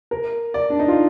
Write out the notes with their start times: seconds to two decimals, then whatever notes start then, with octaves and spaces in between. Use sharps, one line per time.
0.11 A#4
0.54 D5
0.70 D4
0.79 D#4
0.88 F4